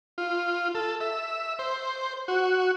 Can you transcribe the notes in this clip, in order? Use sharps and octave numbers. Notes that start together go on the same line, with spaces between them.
F4
A4
E5
C5
F#4